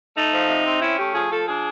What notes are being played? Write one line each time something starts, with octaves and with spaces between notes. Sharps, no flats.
A3 D#4
F3
C3
C4
C#4 E4
A3 G4
F3 G#4
F3 A4
D4 G#4